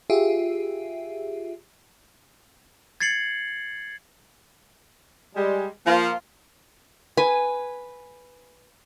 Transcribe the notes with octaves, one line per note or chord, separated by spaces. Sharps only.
F4 G4 G#4 E5
G#6 A6 C7 C#7 F#7
G3 G#3
F3 A#3 F4
B4 G#5